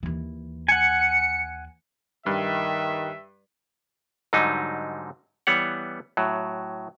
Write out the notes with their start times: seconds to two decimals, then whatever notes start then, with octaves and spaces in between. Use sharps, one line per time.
0.03 D#2 E3
0.68 F#5 G#5 C#7
2.26 G2 D#3 E5
4.33 G#2 D3 F#3 G3 D#4
5.47 E3 G3 B3 C#5 F#5
6.17 A2 F#3